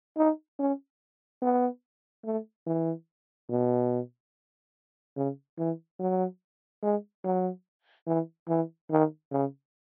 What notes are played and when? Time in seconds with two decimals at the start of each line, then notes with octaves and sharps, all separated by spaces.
0.17 D#4
0.59 C#4
1.42 B3
2.25 A3
2.67 E3
3.50 B2
5.17 C#3
5.58 E3
5.99 F#3
6.83 G#3
7.24 F#3
8.07 E3
8.48 E3
8.91 D#3
9.32 C#3